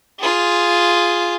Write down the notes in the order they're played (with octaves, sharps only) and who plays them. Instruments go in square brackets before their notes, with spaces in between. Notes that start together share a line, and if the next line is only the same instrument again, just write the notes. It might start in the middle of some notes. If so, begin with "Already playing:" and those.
[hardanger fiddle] F4 G#4